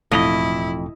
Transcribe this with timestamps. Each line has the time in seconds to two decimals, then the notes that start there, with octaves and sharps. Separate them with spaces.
0.11 E1 F2 A2 E4 D#5